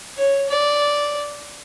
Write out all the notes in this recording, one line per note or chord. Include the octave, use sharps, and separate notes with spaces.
C#5
D5